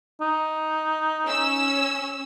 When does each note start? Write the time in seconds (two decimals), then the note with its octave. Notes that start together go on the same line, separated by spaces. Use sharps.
0.21 D#4
1.26 C#4 E6